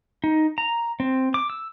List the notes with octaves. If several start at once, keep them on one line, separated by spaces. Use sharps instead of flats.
D#4
A#5
C4
D6
E6